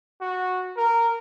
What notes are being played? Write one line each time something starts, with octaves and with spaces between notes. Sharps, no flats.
F#4
A#4